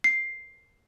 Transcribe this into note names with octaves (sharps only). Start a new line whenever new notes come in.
C7